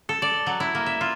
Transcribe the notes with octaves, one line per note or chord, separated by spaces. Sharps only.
A4
D5
F#3
E4
A#3
E5
F4